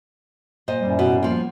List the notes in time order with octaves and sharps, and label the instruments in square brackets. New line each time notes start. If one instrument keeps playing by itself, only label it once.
[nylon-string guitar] A#2 C5 D#5
[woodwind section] F#2 A2 G3
[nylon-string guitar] B2
F3 A#3